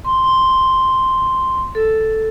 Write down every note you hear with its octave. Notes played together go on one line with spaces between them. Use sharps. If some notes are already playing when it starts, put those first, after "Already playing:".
C6
C6
A4